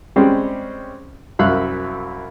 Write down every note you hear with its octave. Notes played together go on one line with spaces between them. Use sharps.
G3 G#3 C4 C#4 G4
C2 F#2 E5 F5 F#6